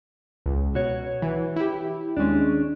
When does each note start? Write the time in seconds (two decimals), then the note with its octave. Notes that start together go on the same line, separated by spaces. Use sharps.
0.46 C#2
0.75 B2 F#4 C#5
1.22 E3
1.56 E4 G4
2.17 D#2 G#3 C#4 D4